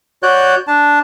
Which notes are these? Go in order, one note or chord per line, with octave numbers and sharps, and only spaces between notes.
F#4 C#5 D5 F#6 G6
D4 A5